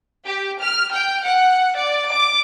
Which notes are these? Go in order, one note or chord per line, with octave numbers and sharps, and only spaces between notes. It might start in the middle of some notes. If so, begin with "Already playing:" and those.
G4
F6
G5
F#5
D5
D6